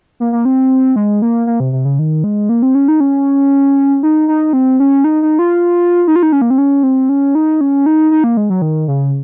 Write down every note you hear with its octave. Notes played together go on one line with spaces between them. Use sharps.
A#3
A#3
C4
G#3
A#3
A#3
C3
C3
C#3
D#3
G#3
A#3
C4
C#4
D#4
C#4
D#4
D#4
C4
C#4
D#4
D#4
F4
D#4
F4
D#4
C#4
A#3
C4
C#4
C4
C#4
D#4
C#4
D#4
D#4
A#3
G#3
F#3
D#3
C#3